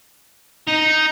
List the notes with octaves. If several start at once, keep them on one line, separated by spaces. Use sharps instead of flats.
D#4